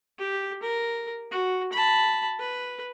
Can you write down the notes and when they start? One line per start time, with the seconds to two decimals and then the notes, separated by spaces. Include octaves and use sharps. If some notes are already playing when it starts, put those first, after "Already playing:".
0.19 G4
0.63 A#4
1.32 F#4
1.73 A5 B5
2.39 B4